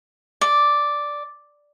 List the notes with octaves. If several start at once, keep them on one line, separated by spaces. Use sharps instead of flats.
D5